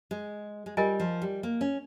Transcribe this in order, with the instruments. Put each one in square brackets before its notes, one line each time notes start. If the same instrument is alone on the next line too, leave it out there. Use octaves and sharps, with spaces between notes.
[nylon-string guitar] G#3
G#3
[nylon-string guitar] G3 [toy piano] F4 A#4 D#5 G#5
[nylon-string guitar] F3
G3
A#3
C#4